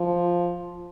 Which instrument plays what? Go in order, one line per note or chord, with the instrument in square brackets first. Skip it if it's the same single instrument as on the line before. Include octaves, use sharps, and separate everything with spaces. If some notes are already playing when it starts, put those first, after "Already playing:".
Already playing: [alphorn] F3